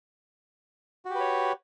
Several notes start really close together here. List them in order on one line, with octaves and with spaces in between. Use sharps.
F#4 G4 B4 C#5